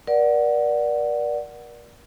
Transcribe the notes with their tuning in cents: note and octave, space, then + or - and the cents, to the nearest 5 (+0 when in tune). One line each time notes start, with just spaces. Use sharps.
A#4 +40 D5 +0 F#5 +0